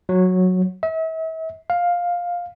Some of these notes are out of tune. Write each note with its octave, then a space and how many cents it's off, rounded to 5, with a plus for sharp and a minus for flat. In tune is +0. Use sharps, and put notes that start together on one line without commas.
F#3 -10
E5 -40
F5 +10